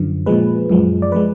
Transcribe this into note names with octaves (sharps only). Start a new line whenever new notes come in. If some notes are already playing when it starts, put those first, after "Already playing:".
Already playing: F#2 D3 F3
A#2 F3 G#3 B4
F#2 F3 G#3
D5
F3 G#3 B4